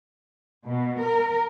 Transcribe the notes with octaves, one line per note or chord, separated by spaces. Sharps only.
B2
A#4